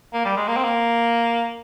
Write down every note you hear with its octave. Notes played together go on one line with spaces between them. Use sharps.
A#3
G3
G#3
A#3
C4
A#3